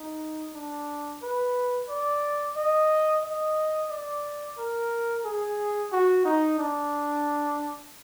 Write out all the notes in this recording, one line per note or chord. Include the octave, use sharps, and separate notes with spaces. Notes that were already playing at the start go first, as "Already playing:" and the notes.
Already playing: D#4
D4
B4
D5
D#5
D#5
D5
A#4
G#4
F#4
D#4
D4